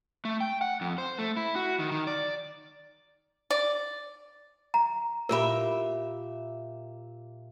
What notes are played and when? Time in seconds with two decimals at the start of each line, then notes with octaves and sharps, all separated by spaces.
0.25 A3
0.41 G5
0.61 F#5
0.81 F2
0.98 C5
1.19 A3
1.37 E4
1.56 F#4
1.80 D#3
1.91 D#3
2.07 D5
3.50 D5
4.74 A#5
5.29 A#2 G4 A#4 E5 B5